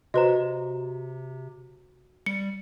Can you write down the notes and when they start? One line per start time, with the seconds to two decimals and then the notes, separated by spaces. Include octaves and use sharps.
0.14 C3 F#4 B4 C5 D#5 A#5
2.26 G3 C#7